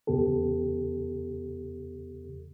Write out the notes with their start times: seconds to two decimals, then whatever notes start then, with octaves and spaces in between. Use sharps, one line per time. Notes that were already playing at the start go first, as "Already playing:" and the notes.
0.07 E2 C#3 B3 G4 A4